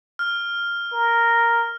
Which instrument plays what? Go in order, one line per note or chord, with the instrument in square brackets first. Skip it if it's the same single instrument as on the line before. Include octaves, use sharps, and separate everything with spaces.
[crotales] F6
[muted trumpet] A#4